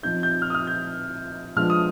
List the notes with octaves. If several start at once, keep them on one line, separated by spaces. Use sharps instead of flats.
F3 C4 D#4 G6
G6
F6
D#6
F6
G6
F3 G#3 B3 D4 F6
D#6